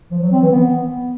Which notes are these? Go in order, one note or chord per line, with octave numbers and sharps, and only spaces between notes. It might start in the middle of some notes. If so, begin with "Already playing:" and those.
F3
F#3
C4
E3
B3